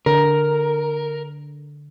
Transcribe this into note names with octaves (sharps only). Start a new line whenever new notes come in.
D3 A#4